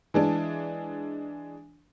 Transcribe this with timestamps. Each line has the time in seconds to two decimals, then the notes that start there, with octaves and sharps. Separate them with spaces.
0.14 E3 G#3 D4